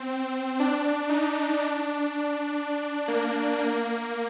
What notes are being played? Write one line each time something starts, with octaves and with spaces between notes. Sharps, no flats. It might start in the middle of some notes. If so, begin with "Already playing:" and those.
Already playing: C4
D4
D#4
D4
A#3
A#3